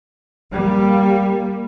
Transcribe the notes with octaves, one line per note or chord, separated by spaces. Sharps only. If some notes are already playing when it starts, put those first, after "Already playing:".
G3 A#3